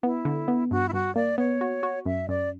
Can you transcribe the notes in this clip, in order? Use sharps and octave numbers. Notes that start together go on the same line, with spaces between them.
B3 E4
D3
B3
G2 F#4
E4
G2 F#4
A#3 D5
B3 C#5
F#4
F#4
F#2 E5
F#2 D5